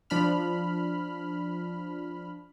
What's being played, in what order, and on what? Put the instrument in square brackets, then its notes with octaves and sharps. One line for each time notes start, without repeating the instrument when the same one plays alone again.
[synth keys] F3 D4 B5 F6